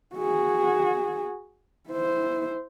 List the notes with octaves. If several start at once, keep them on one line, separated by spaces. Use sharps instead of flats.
F#4 G#4
E4 C5